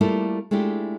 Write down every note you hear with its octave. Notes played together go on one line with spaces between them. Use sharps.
G3 A3 A#3 E4 F4 A4
G#3 A3 D4 E4 F4 G4